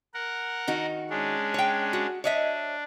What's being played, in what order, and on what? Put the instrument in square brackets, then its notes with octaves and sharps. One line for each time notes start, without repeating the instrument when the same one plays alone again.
[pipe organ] A#4 F#5
[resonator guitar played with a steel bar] D#3 D#4 F#4
[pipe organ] G#3 C#4 D4
[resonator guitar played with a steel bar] C#5 G5
F#4
[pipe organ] D4 [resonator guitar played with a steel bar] C#5 D#5 E5